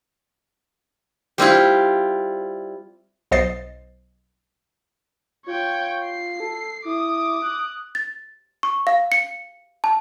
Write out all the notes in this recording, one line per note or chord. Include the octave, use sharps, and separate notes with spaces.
G3 C4 E4 F4
B1 C5 D#5 A6 C7
F4 C#5 G5
C7
A4
E4 D6 D#6
F#6
A6
C#6
F5
C#7
A5